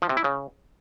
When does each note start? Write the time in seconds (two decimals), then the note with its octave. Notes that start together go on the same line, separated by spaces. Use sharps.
0.02 F3
0.09 C3
0.17 E4
0.24 C#3